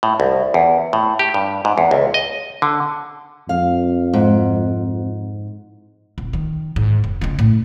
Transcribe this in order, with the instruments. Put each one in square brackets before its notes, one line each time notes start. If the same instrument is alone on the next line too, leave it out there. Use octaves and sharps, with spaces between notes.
[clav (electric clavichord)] A2
C2
E2
A2
G4
G2
G#2
E2
C#2
D#5
D3
[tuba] F2 [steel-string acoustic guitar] F5
[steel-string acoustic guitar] G#2
[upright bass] D#1
D#3
G#2
F1
C#3 G#3
A2